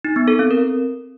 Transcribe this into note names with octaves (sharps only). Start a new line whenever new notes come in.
D#4
B3
A4
C4
A#4